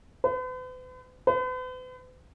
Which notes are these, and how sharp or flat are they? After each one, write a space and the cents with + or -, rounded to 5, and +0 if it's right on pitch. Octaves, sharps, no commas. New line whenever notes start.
B4 +45
B4 +45